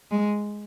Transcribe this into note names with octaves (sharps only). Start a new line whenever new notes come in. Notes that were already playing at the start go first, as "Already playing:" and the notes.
G#3